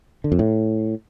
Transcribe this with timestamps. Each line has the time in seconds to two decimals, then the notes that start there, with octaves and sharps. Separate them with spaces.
0.24 D3
0.32 F2
0.39 A2